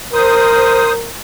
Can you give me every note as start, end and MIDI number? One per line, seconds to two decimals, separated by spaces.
0.13 1.10 70
0.13 0.93 72
0.13 0.93 87